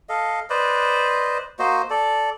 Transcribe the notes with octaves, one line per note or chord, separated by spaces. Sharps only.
A4 D#5 F5
B4 C5 D5 D#5
A#3 F#4 C5 D#5
A4 D5